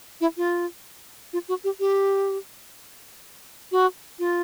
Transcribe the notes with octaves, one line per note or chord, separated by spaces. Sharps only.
E4
F4
F4
F#4
G4
G4
F#4
F4